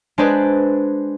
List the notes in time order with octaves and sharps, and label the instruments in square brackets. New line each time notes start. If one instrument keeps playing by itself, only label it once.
[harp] G#3 D4 G#4 B4 C5 D5